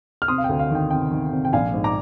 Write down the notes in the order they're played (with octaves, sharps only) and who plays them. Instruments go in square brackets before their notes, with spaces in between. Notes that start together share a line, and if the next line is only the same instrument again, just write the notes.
[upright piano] F6
C3 C6 D#6
F5
D2 G5
F5
D#3 G5
C3 G5
D#3
C3
G5
A#1 F5 G#5
G#2
A#5 D6